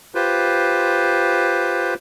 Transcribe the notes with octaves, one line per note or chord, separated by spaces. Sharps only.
F4 G4 B4 C5